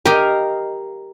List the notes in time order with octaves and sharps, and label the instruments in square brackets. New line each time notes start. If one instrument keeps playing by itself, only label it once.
[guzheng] G4 D#5 [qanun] A#4 F5